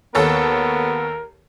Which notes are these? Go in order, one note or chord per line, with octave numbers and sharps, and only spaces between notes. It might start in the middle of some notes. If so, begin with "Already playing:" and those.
D#2 B3 A4 A#4 C#5